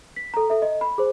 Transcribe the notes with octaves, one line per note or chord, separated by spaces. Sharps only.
B6
A4 A#5
A4 E5
D#5
B5
G#4 C5